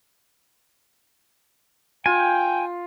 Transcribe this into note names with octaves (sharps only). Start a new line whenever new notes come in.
F4 G5 G#5